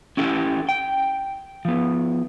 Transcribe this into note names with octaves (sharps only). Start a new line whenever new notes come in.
C#4 E4 G4 A4
G5
F3 B3